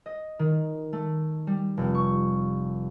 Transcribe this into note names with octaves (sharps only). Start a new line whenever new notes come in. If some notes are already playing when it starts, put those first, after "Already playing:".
D#5
D#3
A3
G3
F1
C#6